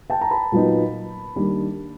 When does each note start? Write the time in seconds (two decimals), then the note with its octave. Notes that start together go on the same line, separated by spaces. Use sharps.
0.10 G5 A5
0.21 A#5
0.31 A5 B5
0.52 A#2 F#3 B3 D#4
1.36 D#3 G3 A#3 D4